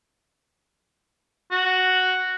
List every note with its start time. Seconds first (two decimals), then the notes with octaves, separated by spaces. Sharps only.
1.52 F#4